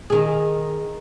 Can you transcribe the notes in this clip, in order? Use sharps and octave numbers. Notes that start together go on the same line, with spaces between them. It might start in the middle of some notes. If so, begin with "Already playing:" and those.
D#3 G#4